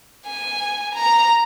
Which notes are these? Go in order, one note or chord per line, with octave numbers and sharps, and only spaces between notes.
G#5
A#5